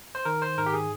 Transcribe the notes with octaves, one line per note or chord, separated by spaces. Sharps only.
C5
D#3 A#4
C5
G#2 A#4
G4
G#4